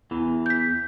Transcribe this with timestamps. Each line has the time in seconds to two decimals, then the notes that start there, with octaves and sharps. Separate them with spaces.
0.11 E2 E3
0.46 G6 B6